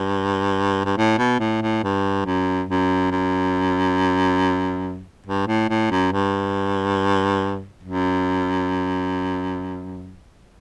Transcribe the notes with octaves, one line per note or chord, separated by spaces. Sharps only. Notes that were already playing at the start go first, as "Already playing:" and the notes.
Already playing: G2
G2
A2
B2
A2
A2
G2
F#2
F#2
F#2
G2
A2
A2
F#2
G2
F#2